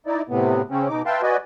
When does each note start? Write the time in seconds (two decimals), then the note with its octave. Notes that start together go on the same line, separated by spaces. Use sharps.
0.07 D#4 E4 D5
0.29 A2 C3 B3
0.71 C#3 C4 C#4
0.88 B2 D#4 D6
1.06 B4 E5 F5 G5 A5 C6
1.22 F#4 B4 D5 D#5 G#5